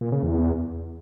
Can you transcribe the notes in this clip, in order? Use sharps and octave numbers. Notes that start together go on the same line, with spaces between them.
A#2
C#3
E2